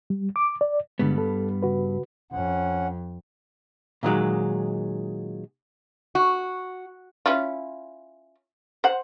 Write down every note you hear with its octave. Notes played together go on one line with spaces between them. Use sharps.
G3
D6
D5
G2 D3 G3 G#3 B3
A4
C#3 F#4 B4
F2 C#4 F#5
A#2 D#3 F#3 G#3
F#4
C#4 E4 F4
C5 F#5